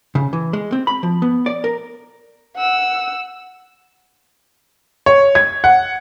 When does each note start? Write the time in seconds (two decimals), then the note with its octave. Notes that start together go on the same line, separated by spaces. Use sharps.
0.15 C#3
0.33 E3
0.53 G#3
0.72 C4
0.87 B5
1.03 F3
1.22 B3
1.46 D5
1.64 A#4
2.56 F#5 E6
5.06 C#5
5.35 G#6
5.64 F#5